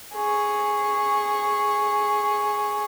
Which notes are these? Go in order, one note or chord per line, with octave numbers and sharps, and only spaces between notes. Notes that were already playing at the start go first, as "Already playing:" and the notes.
G#4 C#6